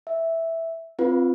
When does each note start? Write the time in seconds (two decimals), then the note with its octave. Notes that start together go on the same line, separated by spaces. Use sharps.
0.07 E5
0.99 C4 F4 B4